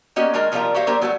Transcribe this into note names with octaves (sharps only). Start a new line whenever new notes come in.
A#3 C#4 F#4 G4 D#5
D#3 G#3 D4 A#4 D#5
C3 F3 G3 C#4 F4 A#4
F#4 G4 C5 C#5 E5 F5
F#3 A#3 D4 G4 A#4 C5
F#3 G3 A3 B3 F4 F#4